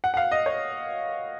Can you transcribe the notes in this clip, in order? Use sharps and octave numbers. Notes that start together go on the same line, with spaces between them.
F#5
F#5
F5
D#5
C#5